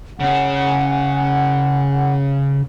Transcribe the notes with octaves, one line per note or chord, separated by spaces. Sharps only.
C#3 C#4 F#5 G#5